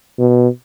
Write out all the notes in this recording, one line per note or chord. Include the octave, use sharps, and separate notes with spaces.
B2